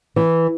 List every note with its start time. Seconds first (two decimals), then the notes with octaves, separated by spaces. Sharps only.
0.16 E3